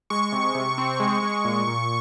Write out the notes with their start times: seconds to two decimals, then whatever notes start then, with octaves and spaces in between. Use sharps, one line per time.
0.10 G#3 C#6
0.32 C3
0.55 C3
0.78 C4
1.00 G#3
1.23 G#3
1.45 A#2
1.67 A#2